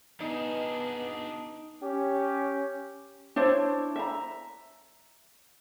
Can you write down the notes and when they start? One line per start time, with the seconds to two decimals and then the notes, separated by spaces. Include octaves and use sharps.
0.20 B3 D4 D#4 G#4
1.82 C#4 G4
3.36 D4 E4 C5 C#5
3.96 E5 A#5